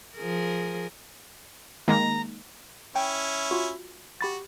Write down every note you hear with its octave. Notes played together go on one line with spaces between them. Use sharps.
F3 G#4 A#4
D#3 G#3 A#3 A#5
C#4 E4 G5
F4 F#4
F#4 G4 B5 A6